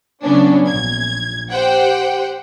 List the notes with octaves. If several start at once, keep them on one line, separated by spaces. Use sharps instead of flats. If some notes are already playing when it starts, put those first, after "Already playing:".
C#3 F#3 B3 C#4 D4
A#1 G#6
G4 C5 F#5 G5